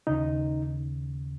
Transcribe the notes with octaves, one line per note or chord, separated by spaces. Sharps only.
D#2 C#3 D#4